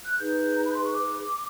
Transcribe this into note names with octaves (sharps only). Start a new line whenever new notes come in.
F#6
D#4 G#4 B4 G6
A#5
B5
C6
C#6
D6